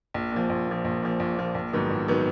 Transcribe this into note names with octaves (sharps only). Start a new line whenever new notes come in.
A#1
A#2 F3
A#1
A#2 F3
A#1
A#2 F3
A#1
A#2 F3
A#1
G#2 D#3 F#3 B3
A#1
D#3 F#3 B3